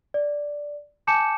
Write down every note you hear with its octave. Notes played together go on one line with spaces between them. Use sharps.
D5
G#5 A5 D6 G6 C#7 E7